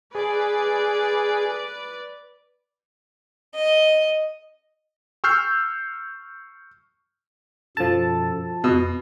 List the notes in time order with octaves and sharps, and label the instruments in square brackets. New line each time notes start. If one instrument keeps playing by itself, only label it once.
[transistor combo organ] G#4 [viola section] B4 D5
[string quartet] D#5
[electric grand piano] C#6 E6 F6 G6 C7
[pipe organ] F#2 B2 A4 [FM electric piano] F3 A5
[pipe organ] F2 [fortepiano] B2